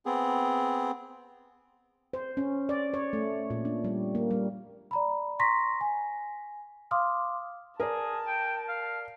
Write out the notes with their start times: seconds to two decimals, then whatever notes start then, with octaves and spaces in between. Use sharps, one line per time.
0.06 B3 C4 G#4
2.13 C5
2.37 C#4
2.69 D5
2.94 C#5
3.13 A3
3.50 A#2
3.65 D4
3.84 G3
4.15 A#3
4.31 G3
4.91 D5 A#5 B5
5.39 A#5 C6 C#6 A#6 B6
5.81 G#5
6.91 F5 C6 D6 D#6 F6
7.80 G#4 A#4 D5 A5
8.27 G5
8.68 F5